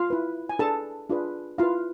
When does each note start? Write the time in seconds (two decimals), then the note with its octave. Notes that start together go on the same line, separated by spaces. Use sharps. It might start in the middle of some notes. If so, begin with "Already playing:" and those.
Already playing: F4 F5
0.10 E4 B4
0.49 G#5
0.59 D4 G#4 A4 B4 A5
1.09 D4 F4 G#4 B4
1.58 E4 F4 B4 F5